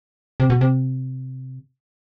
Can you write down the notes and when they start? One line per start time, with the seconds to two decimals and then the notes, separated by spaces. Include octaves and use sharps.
0.40 C3
0.50 B2
0.61 C3